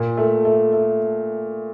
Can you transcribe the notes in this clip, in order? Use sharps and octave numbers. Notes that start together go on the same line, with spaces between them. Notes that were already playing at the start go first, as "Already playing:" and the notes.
Already playing: A#2
A3
A3
A3